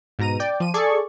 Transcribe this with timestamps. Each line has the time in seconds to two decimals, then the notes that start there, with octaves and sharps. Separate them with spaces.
0.19 G#2 B2 A#5 D#7
0.40 D5 G5
0.60 F3 D#7
0.74 G#4 A4 D5 C#6